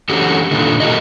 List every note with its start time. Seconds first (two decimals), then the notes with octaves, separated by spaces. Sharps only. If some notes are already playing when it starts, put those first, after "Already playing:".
0.09 D3 E3 C#4 F#4 G4 A4
0.51 A#2 D3 D#3 A3
0.80 F#4 G4 A4 A#4 D#5